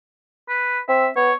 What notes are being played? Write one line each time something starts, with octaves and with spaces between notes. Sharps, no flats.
B4
C4 E5
B3 C#5